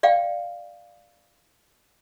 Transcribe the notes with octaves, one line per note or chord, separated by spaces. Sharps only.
D5 F5 G5